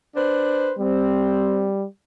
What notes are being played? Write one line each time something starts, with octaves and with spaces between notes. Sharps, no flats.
D4 B4 C5
G3 C4